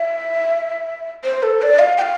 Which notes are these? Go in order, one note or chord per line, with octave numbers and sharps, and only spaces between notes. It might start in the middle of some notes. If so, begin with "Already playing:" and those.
Already playing: E5
C5
A4
D5
F5
G5
F5